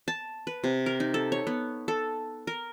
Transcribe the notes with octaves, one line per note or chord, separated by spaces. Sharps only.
A5
B4
C3
A#4
D#4
A4
C#5
B3
A4
A#4